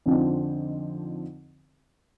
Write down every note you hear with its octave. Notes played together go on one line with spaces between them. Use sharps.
F2 D3 F3 C4 D#4